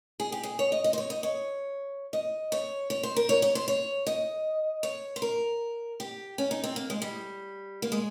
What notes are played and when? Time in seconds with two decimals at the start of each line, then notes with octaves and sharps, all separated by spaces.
0.20 G#4
0.32 G4
0.43 G#4
0.59 C#5
0.72 D#5
0.84 D#5
0.93 C5
0.98 C#5
1.10 D#5
1.23 C#5
2.13 D#5
2.52 C#5
2.90 C#5
3.03 C5
3.16 A#4
3.29 C#5
3.42 C#5
3.55 C5
3.68 C#5
4.07 D#5
4.83 C#5
5.16 C5
5.22 A#4
6.00 G4
6.38 C#4
6.51 D#4
6.64 C4
6.76 A#3
6.90 G#3
7.02 G3
7.82 A#3
7.92 G#3